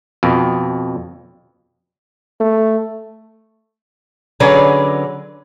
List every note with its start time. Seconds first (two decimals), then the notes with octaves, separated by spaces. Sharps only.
0.23 F2 B2
2.41 A3
4.40 D3 F#3 C#4 G#4 B4 D5